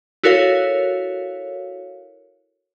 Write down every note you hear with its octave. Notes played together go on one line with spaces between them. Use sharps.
E4 F#4 A4 A#4 C#5 F5